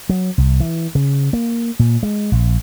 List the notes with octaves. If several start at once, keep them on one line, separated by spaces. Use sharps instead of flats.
F#3
C2
E3
C#3
A#3
A#2
G#3
A#1